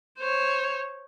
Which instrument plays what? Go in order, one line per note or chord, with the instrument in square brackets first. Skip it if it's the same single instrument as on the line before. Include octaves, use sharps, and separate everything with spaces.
[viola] C5 C#5